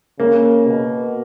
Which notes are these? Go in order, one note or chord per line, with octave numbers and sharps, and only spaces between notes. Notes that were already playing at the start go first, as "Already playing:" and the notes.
C#3 A#3
B2